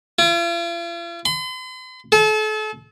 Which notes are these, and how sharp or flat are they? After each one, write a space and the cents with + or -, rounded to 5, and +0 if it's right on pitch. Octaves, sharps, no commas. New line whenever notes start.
F4 -45
C6 -45
A4 -40